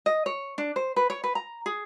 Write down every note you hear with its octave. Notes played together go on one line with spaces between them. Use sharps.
D#5
C#5
D4
C5
B4
C#5
B4
A#5
G#4